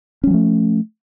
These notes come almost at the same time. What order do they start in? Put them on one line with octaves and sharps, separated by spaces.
C#4 G3 F3 A3